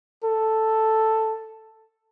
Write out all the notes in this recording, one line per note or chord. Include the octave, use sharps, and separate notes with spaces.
A4